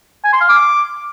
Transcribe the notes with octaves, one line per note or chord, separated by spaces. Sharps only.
G#5
C6
F5
D6